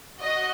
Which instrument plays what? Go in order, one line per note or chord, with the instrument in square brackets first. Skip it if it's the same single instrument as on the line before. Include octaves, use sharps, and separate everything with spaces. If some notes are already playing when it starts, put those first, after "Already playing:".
[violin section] F#4 D#5